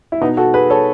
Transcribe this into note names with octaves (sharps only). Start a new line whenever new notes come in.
E4
B2 B3 D#4
F#4 A4
G#4 B4
A4 C#5